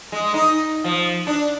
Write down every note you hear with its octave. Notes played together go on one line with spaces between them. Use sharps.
G#3
D#4
F3
D4